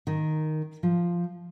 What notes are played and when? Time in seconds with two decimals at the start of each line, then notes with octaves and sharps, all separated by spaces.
0.07 D#3
0.83 F3